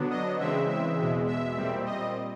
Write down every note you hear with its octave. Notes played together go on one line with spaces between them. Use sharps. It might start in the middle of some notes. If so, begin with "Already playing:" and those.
Already playing: D3 F#3 B3 D4
D#5
C#3 E3 G#3 C4 E5
E5
E2 B2 G#3
E5
A#2 G3 C4
D#5